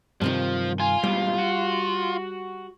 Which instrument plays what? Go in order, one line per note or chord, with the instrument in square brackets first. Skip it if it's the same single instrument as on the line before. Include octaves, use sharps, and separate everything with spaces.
[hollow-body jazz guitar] G2 C3 D#3 [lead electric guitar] F3
[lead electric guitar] F4 [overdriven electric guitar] G#5
[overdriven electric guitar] G#2 B2 [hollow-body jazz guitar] G3
[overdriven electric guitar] F#4